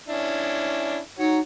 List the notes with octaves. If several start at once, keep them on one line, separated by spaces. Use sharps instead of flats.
C#4 D4 E4
D#4 F#4 C#5